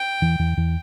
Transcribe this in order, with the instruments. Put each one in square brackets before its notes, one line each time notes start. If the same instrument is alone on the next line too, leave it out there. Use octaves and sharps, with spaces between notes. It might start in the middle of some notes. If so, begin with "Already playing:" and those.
Already playing: [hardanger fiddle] G5
[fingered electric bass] E2 E3
E2 E3
E2 E3